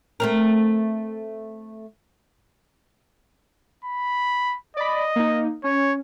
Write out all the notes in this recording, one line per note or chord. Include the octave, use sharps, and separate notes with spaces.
A3 C4 A#4
B5
D5 D#5 B5
A#3 D#4
C#4 C#5